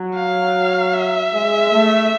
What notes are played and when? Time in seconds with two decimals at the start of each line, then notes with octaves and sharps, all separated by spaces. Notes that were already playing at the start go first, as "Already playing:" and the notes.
Already playing: F#3
0.15 F5
0.94 E5
1.33 G#3
1.72 A3